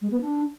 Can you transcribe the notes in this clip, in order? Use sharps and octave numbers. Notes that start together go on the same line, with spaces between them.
G#3
B3
D4